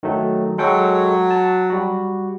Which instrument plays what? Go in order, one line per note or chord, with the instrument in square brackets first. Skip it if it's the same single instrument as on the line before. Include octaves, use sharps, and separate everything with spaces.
[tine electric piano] D#3 F#3 A3
[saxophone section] F#3 [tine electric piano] G#3 A4 G5
[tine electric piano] A5
G3 F#4